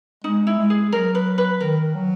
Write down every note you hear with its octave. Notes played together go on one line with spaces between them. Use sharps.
G#3 D#4
E4
G#3
G#4
F#3 A#4
B4
B4
D#3 A#4
F#3